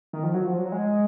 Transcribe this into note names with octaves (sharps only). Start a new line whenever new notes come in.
D#3
F3
F#3
F3
F#3
G#3